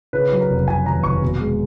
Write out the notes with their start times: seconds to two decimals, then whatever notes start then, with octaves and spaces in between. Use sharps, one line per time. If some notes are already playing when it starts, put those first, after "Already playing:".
0.13 C#3 B4
0.32 F#3
0.41 A#4
0.50 F1
0.67 F1 G#5
0.86 D#2 A#5
1.03 F1 C#6
1.22 B2
1.40 G#3